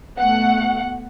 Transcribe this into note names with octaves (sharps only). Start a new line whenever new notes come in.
B2 A3 F#5